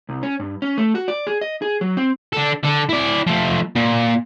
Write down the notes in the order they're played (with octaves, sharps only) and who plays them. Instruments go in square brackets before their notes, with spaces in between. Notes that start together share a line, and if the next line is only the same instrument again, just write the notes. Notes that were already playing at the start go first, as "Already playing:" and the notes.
[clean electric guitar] C2
C#4
G2
C#4
A3
F#4
D5
G#4
D#5
G#4
F#3
C4
[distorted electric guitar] D4 A4
D3 A4
E4 D5
F3 A3
A#2